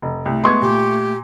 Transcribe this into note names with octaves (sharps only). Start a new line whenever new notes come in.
F1
C2 A3
G#3 B3 C6 C#6 G#6
A#2 G4